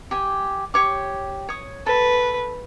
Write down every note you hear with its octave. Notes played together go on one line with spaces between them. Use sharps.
G4 G#5
G4 C#5 D6
C#5 D#6
A4 B4